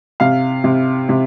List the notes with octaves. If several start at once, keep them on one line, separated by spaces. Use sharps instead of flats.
C3 F5
C3
C3